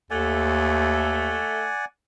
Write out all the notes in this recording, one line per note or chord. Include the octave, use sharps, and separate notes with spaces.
D#2 A3 D5 F#5 G#5